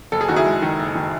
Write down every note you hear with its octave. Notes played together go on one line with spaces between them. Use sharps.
F#1 A4
G#4
D#3 F#4
E4 G#4
G#3
D#3
F#1
D#3